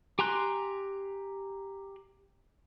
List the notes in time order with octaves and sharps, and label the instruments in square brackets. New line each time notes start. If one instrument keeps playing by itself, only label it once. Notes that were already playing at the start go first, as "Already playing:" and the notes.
[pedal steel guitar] G4 G#5 A#5 C6 F#6